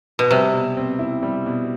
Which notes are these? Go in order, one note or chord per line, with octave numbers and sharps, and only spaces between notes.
B2
C3 G3
B2
C4
E4
G3
B2